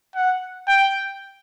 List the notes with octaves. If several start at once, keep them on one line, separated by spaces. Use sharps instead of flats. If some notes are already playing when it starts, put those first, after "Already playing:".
F#5
G5